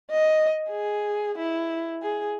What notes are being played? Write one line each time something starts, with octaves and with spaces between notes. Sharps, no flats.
D#5
G#4
E4
G#4